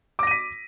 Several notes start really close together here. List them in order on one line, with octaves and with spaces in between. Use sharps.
D6 A#6 D#7 B6